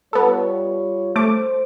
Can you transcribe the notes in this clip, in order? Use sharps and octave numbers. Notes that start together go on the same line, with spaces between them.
G3 B3 F4 A4 C#5
A3 C5 D6